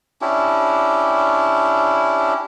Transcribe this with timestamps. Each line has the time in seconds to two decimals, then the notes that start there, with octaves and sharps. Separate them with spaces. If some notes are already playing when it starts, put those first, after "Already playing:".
0.21 C#4 D4 E4 G4